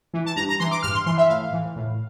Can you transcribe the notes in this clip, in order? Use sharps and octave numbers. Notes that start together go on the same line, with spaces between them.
E3
A5
G2 A#5
A#5
E3 C6
D6
G2 F6
C6
E3 C6
E5
A2 F5
E3
A2